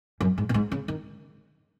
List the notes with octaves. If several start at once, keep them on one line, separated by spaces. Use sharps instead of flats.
F#2
G#2
B2
G#2
C#3
D#3